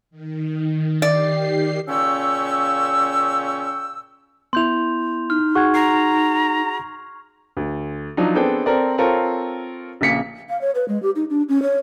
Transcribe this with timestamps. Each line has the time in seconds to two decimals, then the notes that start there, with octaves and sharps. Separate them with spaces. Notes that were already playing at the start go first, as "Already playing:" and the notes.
0.11 D#3
1.02 D#3 G4 D5 C7
1.88 A#2 C#3 C#4 G5 C#6 E6
4.53 B3 E4 C6 G6 F7
5.30 D#4 F6
5.55 F#4 G#4 F#5 C#6 G#6
5.75 A#5 C7
7.57 D2
8.17 F3 F#3 D4 D#4
8.35 B3 C4 D4 G#4 A4 G5
8.66 C4 A4 A#4 D5
8.98 C4 F4 A4 A#4 C#5
10.01 A#1 C#3 A#3 B6 C#7
10.49 F5
10.61 C#5
10.75 B4
10.88 G#3
11.03 G4
11.16 D#4
11.30 D4
11.49 C#4
11.63 C#5